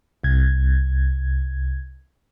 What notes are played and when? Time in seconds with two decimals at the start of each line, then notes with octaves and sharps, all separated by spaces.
0.24 C2 G#6